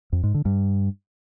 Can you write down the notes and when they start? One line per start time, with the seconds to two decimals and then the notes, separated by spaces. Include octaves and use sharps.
0.12 F2
0.23 G#2
0.34 D3
0.45 G2